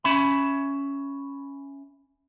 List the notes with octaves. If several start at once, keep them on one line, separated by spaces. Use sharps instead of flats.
C#4 E5 B5